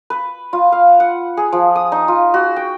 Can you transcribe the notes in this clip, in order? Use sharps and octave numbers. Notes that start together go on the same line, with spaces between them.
B4
F4
F5
F#5
G#4
F3
D#6
D#4
F4
F#4
G5